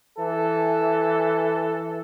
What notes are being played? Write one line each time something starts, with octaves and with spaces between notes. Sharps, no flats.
E3 A4